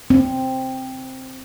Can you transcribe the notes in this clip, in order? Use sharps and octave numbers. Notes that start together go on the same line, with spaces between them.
C4